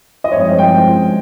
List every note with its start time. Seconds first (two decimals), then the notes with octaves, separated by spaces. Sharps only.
0.24 D#5
0.31 G2 F3 G#3 C4 C#5
0.41 D#5
0.59 G5